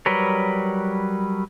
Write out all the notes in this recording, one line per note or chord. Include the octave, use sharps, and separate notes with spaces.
F#3 G3 A#4 B4 C#5